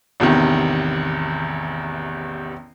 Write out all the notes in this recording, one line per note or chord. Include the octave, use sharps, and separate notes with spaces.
A1 E2 C3 D#3